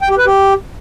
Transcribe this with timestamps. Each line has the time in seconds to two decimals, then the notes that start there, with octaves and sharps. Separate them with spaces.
0.02 G5
0.10 G4
0.18 B4
0.26 G4